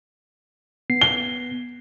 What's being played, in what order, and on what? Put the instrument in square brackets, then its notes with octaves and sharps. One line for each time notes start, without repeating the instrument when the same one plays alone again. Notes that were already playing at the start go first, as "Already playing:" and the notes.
[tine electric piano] B3 C7
[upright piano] G7